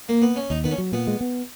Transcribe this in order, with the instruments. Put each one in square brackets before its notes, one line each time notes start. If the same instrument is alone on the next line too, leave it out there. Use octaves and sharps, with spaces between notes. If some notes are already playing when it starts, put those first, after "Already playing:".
[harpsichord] A#3
B3
C#4
[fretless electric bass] D#2 [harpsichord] D#4
[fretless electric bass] D#3 [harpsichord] B3
[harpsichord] C#4
[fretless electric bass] F#3
[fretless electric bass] A#2 [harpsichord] B3
[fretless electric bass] G#3
B3